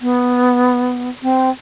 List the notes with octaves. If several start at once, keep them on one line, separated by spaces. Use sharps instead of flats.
B3
C4